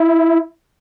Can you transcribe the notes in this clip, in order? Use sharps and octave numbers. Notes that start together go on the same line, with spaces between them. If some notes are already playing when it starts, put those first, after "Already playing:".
Already playing: E4